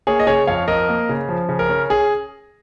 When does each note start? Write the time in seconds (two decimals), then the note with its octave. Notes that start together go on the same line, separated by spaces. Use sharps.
0.07 A#3 G#4 C#5
0.20 D#5
0.27 C#3 G#4 C#5
0.47 F2 C#5 F5
0.68 F2 A#4 D#5
0.89 A#3
1.09 C#3
1.29 F3
1.49 C#3
1.59 A#4
1.69 C#4
1.90 G#4